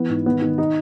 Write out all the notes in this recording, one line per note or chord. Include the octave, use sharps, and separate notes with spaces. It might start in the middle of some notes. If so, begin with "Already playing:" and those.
Already playing: E3 B3
G#2
D#3 B3
D#3
D#4